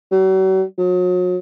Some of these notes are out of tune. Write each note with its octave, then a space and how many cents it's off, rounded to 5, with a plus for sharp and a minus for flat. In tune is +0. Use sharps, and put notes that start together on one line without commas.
F#3 +40
F#3 -40